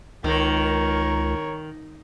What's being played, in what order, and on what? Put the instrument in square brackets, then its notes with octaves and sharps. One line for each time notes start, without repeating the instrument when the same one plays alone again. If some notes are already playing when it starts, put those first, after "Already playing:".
[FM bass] C#2 [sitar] D#3 [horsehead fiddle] A#4 C#5